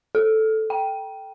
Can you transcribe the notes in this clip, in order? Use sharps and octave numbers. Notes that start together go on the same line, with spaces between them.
A4
G5